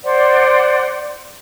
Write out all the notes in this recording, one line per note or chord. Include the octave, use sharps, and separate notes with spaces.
C5 D5 F#5